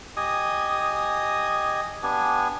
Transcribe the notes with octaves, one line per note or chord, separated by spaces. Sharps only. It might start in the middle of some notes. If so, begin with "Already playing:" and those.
G4 D#5 G#5 D#6
B3 D4 G4 G#5